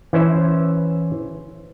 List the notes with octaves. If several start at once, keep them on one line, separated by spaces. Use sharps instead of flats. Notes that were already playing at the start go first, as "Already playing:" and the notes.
E3 C#4 C5 E5